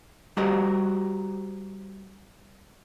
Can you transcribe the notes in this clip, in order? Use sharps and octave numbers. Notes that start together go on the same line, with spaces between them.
G3 F#4 G4 A#4 C5 D#5